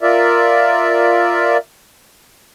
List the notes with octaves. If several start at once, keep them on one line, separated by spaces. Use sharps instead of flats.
F4 A#4 D5 E5